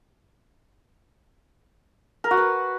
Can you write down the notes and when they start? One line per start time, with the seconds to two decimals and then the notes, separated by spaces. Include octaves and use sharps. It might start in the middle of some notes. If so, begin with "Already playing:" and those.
2.24 A#4
2.31 F#4
2.37 B4